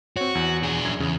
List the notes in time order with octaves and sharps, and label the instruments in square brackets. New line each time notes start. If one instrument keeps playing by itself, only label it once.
[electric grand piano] C4 C#5 [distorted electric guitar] F#4
[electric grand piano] E2
[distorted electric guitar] D4 G#4
[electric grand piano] F#2 G#6
[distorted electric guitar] E2 [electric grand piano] C#3